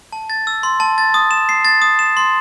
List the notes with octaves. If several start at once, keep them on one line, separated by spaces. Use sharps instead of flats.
A5
A6
E6
C6
A5
A6
D#6
E7
C7
A6
D#6
E7
C6